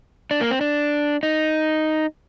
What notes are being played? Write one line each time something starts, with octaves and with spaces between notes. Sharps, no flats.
D4
A#3
C4
D4
D#4